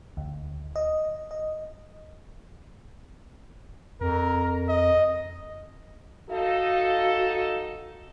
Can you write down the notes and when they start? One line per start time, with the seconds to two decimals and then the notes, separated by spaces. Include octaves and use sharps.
0.17 D2
0.76 D#5
1.31 D#5
4.01 F2 A#4
4.69 D#5
6.30 D#4 F#4 A4 F5